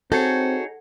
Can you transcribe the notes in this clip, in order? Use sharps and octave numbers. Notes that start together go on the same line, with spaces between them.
C4 D#4 F#4 G#4 A4 C#5